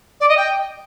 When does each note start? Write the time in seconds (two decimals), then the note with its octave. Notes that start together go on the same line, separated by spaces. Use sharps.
0.20 D5
0.29 D#5
0.37 G5